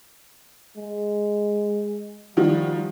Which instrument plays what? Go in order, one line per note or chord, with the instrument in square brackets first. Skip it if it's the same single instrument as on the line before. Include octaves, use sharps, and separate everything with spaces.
[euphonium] G#3
[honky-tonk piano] D#3 F3 F#4 [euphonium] G3